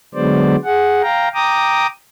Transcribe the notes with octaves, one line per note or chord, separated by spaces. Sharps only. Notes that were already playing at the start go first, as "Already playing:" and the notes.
D3 F#3 G#3 B3 C5 D5
G#4 F#5
F5 G5 A#5
G5 A#5 D6 D#6